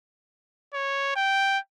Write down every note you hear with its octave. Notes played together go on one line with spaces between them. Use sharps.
C#5
G5